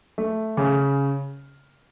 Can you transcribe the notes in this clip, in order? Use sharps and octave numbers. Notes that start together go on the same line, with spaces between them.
A3
C#3